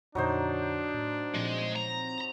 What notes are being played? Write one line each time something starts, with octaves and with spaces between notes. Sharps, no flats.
F2 A#2 D3 F#3 D4 D#4 C5
A2
A#2 F3 G#3 C4
A#5